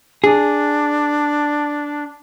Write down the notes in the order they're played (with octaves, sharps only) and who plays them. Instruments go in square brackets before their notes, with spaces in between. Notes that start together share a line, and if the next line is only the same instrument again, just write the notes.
[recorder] D4 [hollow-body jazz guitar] G#4